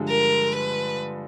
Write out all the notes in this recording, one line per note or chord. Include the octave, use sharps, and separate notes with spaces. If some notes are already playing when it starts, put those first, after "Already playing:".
Already playing: G2 D3 F3 G#3
A#4
B4